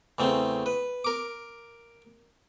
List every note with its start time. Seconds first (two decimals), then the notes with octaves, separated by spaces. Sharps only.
0.18 E2 C#3 A3 C4
0.66 B4
1.04 A#4 D6